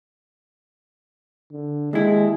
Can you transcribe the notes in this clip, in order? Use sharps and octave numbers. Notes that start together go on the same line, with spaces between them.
D3
D#2 G#3 E4